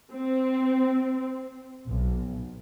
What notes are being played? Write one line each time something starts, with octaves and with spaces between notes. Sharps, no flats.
C4
B1